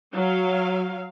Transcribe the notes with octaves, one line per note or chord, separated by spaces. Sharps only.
F#3 F5